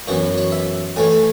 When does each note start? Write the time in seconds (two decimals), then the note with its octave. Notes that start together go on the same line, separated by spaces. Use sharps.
0.08 F#2 E3 B3 F#4
0.38 C#5
0.52 E5
0.96 A2 E3 A3 G#5
1.12 G#5